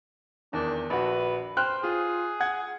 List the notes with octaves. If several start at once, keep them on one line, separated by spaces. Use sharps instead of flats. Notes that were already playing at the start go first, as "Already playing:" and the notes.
E2 D#3 D4
A#1 F#4 B4
C5 G5 F6 F#6
F4 G#4
F#5 G#6